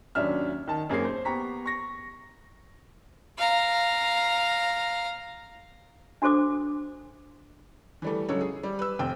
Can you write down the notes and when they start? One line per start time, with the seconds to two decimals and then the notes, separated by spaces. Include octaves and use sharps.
0.15 D#2 F#3 C#4 D4 E5 F6
0.68 D#3 A5
0.90 F#2 A#3 C4 G#4 C#5 C7
1.05 C5
1.25 B3 G4 A#5 C#6 B6
1.66 C#6 A#6
3.37 F5 A#5
6.22 D4 F#4 A4 C5 D6 D#6
8.02 E3 G3 A3
8.29 C#3 F#3 G#3 A4 C#5
8.41 G#4
8.63 G3
8.79 B4 E6
8.99 F1 C4 G5